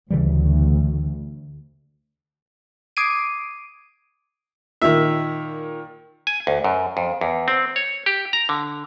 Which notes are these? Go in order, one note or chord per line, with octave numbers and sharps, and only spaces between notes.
D2 C#3 E3 G3
D6 D#6 G#6 C7 D7 D#7
A#2 D#3 E5
G#5
D2
F#2
F2
E2
C4
C#5
G4
A#5
D3